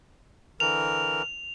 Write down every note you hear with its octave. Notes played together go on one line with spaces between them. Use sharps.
D3 E3 A#4 F7